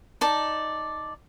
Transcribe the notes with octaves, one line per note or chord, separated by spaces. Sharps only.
D#4 D5 A5